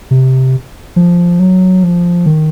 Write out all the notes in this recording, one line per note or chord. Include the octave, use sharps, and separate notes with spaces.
C3
F3
F#3
F3
D#3